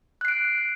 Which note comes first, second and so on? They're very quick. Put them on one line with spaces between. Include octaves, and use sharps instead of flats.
F#6 C7 D7